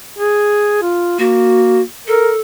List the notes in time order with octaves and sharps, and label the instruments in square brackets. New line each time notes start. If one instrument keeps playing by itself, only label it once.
[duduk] G#4
F4
[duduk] A#3 [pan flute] F#4
[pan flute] A4 [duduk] A#4